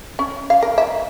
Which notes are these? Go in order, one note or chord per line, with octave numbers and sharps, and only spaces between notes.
C#4
F5
A#4
E5